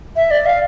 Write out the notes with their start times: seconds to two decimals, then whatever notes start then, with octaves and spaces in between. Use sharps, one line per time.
0.16 E5
0.31 D5
0.46 F5